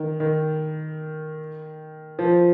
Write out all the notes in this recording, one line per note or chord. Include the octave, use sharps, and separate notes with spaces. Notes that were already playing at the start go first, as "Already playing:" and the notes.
Already playing: D#3
D#3
F3